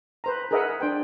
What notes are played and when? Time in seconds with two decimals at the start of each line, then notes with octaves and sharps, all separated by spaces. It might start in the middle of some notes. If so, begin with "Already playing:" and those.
0.24 B4 C5 A#5
0.51 G#4 A#4 B4 D#5 E5 F#5
0.80 D4 C5 G5